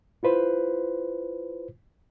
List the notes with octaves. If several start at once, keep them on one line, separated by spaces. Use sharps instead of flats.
E4 F4 B4 C5